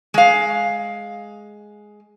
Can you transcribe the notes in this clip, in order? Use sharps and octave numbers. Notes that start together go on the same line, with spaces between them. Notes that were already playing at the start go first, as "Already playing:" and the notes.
G#3 F5